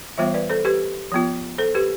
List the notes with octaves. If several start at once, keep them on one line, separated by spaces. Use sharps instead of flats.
E3 G3 B3 F4 C5 E5
B4 D5
A4 C5
G4 B4
F3 B3 F4
A4 C5
G4 B4